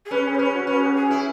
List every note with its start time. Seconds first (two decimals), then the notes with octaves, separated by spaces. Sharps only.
0.05 G#4
0.11 C#4 B4
0.25 G#4
0.34 C#5
0.38 C#4 B4
0.53 F#4
0.67 C#4 B4
0.76 G#4
0.85 F#4
0.95 G#4
1.11 E4